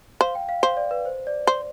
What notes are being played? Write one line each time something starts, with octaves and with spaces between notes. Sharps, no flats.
C5 F5
G5
F5
C5 F5
D5
B4
C5
D5
C5